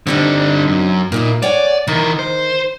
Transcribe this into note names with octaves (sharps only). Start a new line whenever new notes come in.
D3 G3 C4 D4 D#4
F#2
A#2 A#3 D#4 E4
C#5 D5 F#5 G#5
D#3 E3 A#4
C5